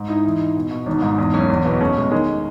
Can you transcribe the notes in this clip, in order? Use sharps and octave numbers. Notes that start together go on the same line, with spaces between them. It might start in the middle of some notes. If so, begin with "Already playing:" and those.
Already playing: G#2
D#4 E4
E3
D#4
B2
B2
G#1 D#4
G#2 D#4
E2 D#4
F#1 C#4
E2 C#4
B2 B3
A3 C#4
B2 G#3
D#3 G#3